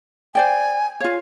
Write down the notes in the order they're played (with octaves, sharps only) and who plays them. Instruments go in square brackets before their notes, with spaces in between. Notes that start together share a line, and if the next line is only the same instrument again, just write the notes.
[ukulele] C5 D5 G5 [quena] G#5
[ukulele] F4 C#5 [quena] F5